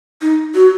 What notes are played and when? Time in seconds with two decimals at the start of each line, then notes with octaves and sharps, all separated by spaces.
0.22 D#4
0.55 F#4